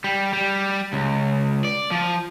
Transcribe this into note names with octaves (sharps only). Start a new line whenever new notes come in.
G3
G3
C#2
D5
F3